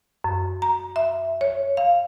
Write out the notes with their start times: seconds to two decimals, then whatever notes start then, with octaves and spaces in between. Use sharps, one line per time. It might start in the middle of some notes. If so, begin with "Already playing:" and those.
0.24 F#2
0.62 A#5
0.96 E5
1.41 C#5
1.77 F5